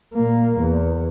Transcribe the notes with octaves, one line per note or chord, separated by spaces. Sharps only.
A#2 A#3
E2